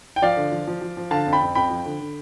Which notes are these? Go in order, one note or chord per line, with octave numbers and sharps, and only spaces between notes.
G5
F3 D5 F5
D3
F3
F3
F3
F3
D3 F5 A5
F2
G5 B5
F2
F2 G5 B5
F3
D3
D3